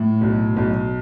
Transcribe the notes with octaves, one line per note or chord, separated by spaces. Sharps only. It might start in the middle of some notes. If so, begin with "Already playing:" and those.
Already playing: A2
B1
B1